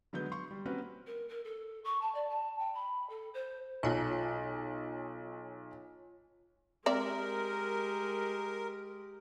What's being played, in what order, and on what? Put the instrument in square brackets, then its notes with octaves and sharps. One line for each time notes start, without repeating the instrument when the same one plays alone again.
[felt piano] D3 F#3 G#3 B3 G6
C6 C#6
G3
A#3 C4 C#4 F#4 A#4 B4
[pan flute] A#4
A#4
A4
C#6
A5
D5
A5
G5
B5
A4
C5
[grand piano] B1 [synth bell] F4 C#5 G#5
[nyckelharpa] G#3 G4 [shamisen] C4 D5 E5 [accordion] A#4